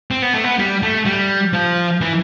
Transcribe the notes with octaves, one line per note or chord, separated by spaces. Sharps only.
C4
B3
A3
B3
G3
A3
G3
F3
E3